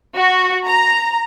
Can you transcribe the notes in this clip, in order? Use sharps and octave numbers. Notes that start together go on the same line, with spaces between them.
F#4
A#5